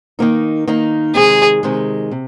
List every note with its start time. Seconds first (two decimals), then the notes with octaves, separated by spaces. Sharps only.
0.19 D#3 A#3 D#4
0.67 D#3 A#3 D#4
1.15 C3 D#3 G#3 G#4
1.63 C3 D#3 G#3
2.11 C3